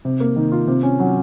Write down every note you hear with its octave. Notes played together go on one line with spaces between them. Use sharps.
C3
A#3
D#3
F4
C3
C#4
F#3